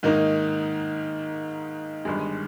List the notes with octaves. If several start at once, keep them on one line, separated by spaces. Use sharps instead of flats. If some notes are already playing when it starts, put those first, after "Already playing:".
G#2 D#3 A#3 D#4
G1 G2 D#3 G#3